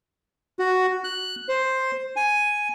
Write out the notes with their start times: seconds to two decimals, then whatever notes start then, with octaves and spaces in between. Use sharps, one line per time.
0.59 F#4
1.04 F#6
1.49 C5
2.16 G#5